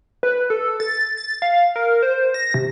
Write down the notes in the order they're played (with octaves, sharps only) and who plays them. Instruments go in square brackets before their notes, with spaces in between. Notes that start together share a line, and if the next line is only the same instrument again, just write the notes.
[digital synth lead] B4
A4
A6
A6
F5
A#4
C5
A#6
C3